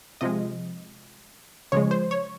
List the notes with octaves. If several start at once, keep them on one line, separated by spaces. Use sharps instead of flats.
C3 F3 G#3 D#5
C#3 F3 G#3 C#5
C5
C#5